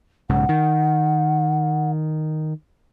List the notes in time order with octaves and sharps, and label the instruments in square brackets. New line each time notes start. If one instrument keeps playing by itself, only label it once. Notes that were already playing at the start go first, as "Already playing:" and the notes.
[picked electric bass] B1 G#2 C#3 [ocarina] F#5
[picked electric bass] D#3